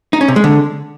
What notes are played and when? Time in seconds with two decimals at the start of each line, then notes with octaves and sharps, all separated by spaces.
0.13 D#4
0.21 C#4
0.28 C3
0.36 G#3
0.44 D3